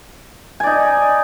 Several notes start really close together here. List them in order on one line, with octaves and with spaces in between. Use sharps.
G#5 D5 D#4